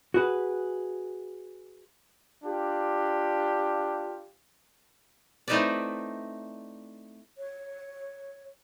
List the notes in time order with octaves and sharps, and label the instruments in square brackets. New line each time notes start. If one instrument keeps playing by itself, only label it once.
[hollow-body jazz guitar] F#4 G#4 B4
[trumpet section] D4 F4 G4
[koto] A3 C4 D#4 E4 B4 D5
[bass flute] C#5